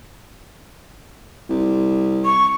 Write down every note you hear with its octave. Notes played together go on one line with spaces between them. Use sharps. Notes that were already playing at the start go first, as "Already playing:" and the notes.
C2
C#6